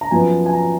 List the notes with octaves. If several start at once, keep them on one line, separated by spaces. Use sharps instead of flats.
A#5
F#2 F3 B3 G#5
G#5
A#5